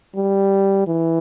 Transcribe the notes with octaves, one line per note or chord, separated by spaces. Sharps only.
G3
E3